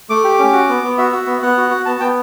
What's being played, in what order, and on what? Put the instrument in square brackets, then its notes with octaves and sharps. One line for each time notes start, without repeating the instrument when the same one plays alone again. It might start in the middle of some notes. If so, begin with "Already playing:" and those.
[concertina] A3 D6
G4
C#4
F#4
B3
B3
F#4 E5
F#4
B3
B3 F#5
F#4
F#4
B3 A5
B3 G5